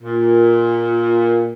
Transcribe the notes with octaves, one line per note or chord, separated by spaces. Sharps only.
A#2